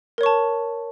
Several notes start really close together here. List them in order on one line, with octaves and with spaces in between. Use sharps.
A#4 C#5 C#6 A5